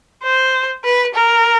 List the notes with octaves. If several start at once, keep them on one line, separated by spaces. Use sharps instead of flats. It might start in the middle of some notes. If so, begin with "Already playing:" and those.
C5
B4
A#4